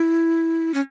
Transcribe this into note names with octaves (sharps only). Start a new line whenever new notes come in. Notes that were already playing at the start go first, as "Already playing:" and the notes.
Already playing: E4
C#4